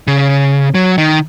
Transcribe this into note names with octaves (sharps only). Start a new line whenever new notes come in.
C#3
F#3
D#3